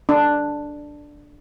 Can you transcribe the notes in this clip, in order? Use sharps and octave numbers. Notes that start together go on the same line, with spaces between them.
D4